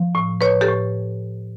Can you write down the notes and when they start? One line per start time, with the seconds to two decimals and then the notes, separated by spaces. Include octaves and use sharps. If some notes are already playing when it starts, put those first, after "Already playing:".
Already playing: F3
0.15 A2
0.41 A2 B4 C#5
0.61 G4 A4
0.68 A2